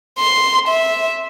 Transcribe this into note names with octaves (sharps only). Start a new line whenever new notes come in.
C6
E5